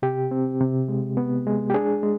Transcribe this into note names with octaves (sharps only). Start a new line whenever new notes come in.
C3 G4
C4
C3
G#3
B3
G#3
G4
D4 G#4
G#3